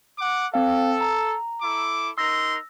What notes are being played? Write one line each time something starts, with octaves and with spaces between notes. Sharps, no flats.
F#5 D6
C4 A4 F5
A#5
E4 A4 D6
D#4 A#4 C6 E6 A#6